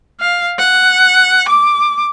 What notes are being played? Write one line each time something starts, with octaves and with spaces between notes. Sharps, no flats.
F5
F#5
D6